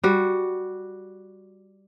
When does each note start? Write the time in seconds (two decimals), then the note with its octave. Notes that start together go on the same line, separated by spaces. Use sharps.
0.04 G3 F#4